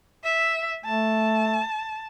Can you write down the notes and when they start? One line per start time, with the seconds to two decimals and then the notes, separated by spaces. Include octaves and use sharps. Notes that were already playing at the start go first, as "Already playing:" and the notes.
0.24 E5
0.85 A3 A5